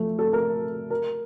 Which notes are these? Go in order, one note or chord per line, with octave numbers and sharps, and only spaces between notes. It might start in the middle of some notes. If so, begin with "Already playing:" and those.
Already playing: F3 A3
A4
A#4
A#4